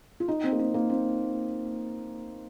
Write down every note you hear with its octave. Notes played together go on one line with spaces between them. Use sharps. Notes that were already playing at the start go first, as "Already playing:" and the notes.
F4
D#4
C4
A#3
C4
A#3
C4